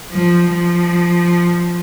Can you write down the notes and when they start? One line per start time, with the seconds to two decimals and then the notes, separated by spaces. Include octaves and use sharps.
0.11 F3
0.51 F3